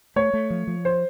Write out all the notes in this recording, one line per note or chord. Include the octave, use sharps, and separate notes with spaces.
A3 C#5
A3
F3
F3
C5